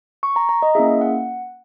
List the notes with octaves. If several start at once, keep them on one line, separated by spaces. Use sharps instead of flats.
C#6
A#5
A#5
D#5
A#3 C#4 E4 G#4 E5
F#5